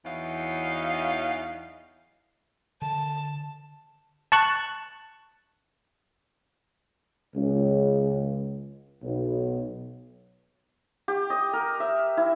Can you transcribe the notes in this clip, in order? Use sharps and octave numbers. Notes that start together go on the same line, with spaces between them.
E2 E3 F#3 D#4 C#5 F5
D3 A5
A5 C#6 F#6
C#2
B1
G4
D#5
A#4
E5
E4